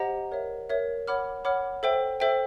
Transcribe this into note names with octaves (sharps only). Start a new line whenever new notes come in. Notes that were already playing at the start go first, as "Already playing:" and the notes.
Already playing: G4 C5 D#5 F#5 A#5
A#4 C#5 E5
A#4 C#5 E5
C#5 F#5 B5 D6 F6
C#5 F#5 B5 D6 F6
A4 C5 E5 G5
A4 C5 E5 G5